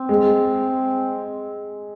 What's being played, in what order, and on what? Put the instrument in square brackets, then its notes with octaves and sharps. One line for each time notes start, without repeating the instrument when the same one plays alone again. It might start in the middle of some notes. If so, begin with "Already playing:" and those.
Already playing: [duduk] C4
[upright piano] G#3